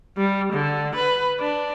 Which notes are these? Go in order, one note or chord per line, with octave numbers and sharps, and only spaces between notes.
G3
D3
B4
D4